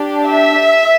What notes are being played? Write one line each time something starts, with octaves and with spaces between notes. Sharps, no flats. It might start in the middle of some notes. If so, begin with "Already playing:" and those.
Already playing: D4 G4
E5